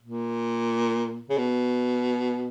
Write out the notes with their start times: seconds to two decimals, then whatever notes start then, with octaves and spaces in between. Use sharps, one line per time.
0.03 A#2
1.29 C#3
1.38 B2